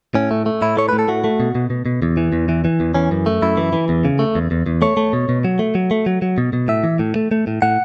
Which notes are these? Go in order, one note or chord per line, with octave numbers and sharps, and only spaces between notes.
A2 C#4
A3
A3
A2 E4
A3 C#5
A2 B4
A4
A3 F#4
A3
B2
B2
B2
B2
E2
E3
E2
E3
E3
E2
E3 C#4
F#2
A3
F#2 E4
E3
E3
E2
C#3
A3
E2
E2
E2
A3 C#5
A3
B2
B2
F#3
A3
F#3
A3
F#3
F#3
B2
B2
A2 E5
E3
A2
A3
A3
A2
A2 F#5